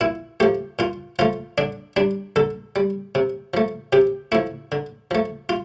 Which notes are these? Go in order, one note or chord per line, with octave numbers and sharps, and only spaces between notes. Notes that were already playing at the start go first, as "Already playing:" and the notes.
A#2 E4
F3 A3 G4
A#2 F4
F3 A3 F4
D3 D4
G3 D4
D3 A4
G3
C3
F3 A3
C3 G4
F3 A3 E4
D3
F3 A3
F4